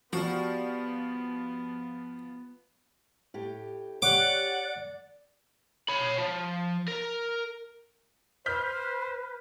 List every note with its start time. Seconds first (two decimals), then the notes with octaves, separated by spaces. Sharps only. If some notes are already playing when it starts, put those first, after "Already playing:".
0.13 F3 G3 B3 F#4 A#4
3.34 A2 G4
4.02 G4 C#5 D5 F#5 D6
5.89 C#5 B5
6.18 F3
6.88 A#4
8.46 B4 C5 F6 G6 B6